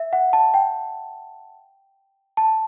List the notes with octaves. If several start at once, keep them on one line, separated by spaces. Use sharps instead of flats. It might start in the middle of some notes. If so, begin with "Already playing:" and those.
Already playing: E5
F#5
A5
G5
A5